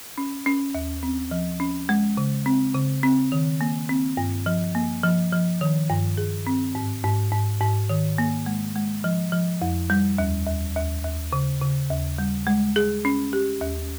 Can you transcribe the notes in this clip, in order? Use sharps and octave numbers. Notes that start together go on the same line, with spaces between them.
C#4
C#4
D#2
C4
F3
C#4
G#3
C#3
C4
C#3
C4
D#3
A#3
C4
G2
F3
A#3
F3
F3
D#3
G2
G#4
C4
G#2
G#2
G#2
G#2
D#3
A#3
G#3
G#3
F3
F3
F2
G3
D#2
D#2
D#2
D#2
C#3
C#3
D#2
G3
G#3
G#4
C#4
G4
D#2